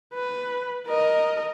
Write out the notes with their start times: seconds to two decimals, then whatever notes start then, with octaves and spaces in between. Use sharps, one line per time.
0.14 B4
0.87 A#4 D#5